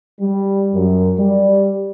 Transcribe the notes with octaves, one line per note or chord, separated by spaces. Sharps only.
G3
F#2
G3